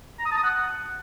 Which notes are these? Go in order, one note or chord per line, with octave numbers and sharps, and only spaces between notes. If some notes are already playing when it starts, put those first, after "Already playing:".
A#5
D#6
A5
D#6
F#5